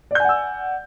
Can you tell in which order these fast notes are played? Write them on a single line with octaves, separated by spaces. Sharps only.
D5 G6 G#5 F#5 E6